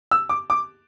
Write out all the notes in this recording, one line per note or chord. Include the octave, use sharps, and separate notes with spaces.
E6
D6
D6